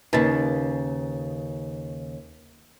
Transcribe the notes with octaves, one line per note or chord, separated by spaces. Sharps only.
D#2 C#3 D#4 B4 A6